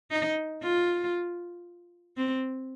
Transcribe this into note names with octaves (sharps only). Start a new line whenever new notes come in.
D#4
F4
C4